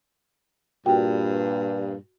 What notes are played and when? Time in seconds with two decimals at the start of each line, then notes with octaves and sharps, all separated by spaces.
0.86 G2 A#2 F#4 G5